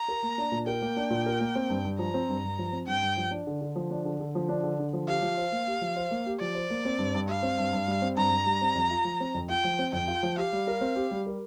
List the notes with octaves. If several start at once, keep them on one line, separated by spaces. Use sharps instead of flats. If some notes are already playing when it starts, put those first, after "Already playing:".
Already playing: A#5
A#4
A#3
D4
A#2
A#4 G5
A#3
D4
A#2
A#4
A#3
C4
G2
G2
F3 A#5
C4
G2
G2
F3
C4
G2 G5
G2
F3
D4
D3
D3
F3
D4
D3
D3
F3
D4
D3
D3
F3
G4 F5
F3
C5
A#3
G4
F3
C5
A#3
G4
F3 D5
C5
A#3
C4
G2
G2
G3 F5
C4
G2
G2
G3
C4
G2 A#5
G2
G3
C4
F2
F4
F3
C4
F2
F4 G5
F3
C4
F2 G5
F4
F3
G4 F5
G3
A#4
C4
G4
G3
A#4